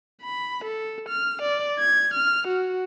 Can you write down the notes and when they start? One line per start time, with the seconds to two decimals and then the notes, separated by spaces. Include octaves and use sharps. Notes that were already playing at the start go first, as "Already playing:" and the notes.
0.22 B5
0.65 A4
1.09 F6
1.42 D5
1.79 G#6
2.14 F6
2.48 F#4